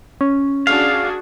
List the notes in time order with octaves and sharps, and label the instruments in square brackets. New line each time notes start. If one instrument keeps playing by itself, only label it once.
[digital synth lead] C#4
[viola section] D4 F#4 G#4 [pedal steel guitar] F5